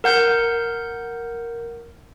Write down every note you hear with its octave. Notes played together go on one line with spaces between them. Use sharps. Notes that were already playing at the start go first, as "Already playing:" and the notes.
A#4 F#5 G6